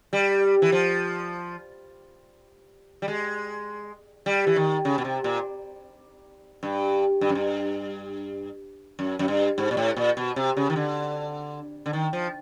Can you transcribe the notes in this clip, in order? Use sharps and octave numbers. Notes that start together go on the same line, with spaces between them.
G3
E3
F3
G3
G#3
G3
E3
D#3
C#3
B2
C3
A#2
G2
G2
F#2
G2
F#2
F#2
G2
G#2
A#2
A2
A#2
B2
C3
C#3
D#3
D3
D3
D#3
F3